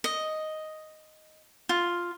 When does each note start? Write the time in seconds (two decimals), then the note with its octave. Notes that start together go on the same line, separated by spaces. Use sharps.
0.04 D#5
1.69 F4